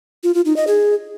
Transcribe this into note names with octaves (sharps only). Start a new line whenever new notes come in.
F4
F4
D#4
D#5
G#4